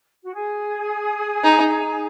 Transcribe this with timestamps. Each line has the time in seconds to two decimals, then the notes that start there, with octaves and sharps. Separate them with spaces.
0.24 F#4
0.34 G#4
1.44 D#4